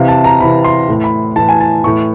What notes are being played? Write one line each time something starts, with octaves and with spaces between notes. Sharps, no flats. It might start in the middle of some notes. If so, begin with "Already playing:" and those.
Already playing: C3 E3 F5
A5
A#5
C3 E3 B5
C6
A2 E3
B5
A2 E3 A5
G#5
A5
A2 E3 C#6